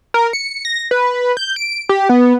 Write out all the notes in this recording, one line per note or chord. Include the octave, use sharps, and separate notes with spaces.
A#4
C#7
A#6
B4
G6
D7
G4
B3